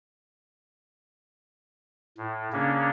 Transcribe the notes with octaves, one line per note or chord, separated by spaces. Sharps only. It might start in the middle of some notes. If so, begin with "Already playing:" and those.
A2
C#3 A#3 C#4 D4